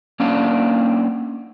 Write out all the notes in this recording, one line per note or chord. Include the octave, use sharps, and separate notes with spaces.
A#3 C#4 D4 D5 F5